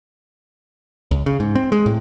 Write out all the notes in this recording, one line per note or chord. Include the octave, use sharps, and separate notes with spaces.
C#2
C#3
G#2
C4
G#3
A2